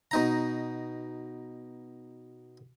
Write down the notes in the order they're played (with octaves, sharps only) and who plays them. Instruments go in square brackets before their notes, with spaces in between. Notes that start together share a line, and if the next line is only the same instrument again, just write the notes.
[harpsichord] B2 D#4 A#5